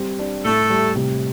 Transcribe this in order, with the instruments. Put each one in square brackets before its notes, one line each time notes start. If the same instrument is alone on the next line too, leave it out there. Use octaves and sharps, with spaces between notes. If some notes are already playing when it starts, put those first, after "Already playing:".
Already playing: [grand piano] G3 C4
D4
[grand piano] A2 [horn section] A3 A4
[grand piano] G3
C3